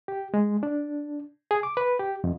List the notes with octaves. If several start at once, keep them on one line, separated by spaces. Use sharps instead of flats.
G4
G#3
D4
G#4
D6
B4
G4
F2